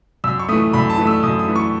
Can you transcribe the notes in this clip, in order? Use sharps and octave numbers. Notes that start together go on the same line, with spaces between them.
F#2 E6
C#6
E3 A3 D#6
F#2 B5
A5
E3 A3
E6
F#2 D#6
D#6
E3 A3
C#6